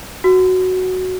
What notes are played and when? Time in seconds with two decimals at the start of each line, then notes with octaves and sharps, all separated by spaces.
0.24 F#4